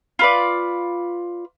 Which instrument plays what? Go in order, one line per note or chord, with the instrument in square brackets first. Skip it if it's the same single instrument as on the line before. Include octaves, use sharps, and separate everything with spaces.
[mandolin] F4 B4 D5